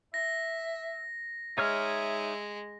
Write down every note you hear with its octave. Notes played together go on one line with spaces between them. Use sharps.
E5 A#6
G#3 D#4 C#5 E5 F6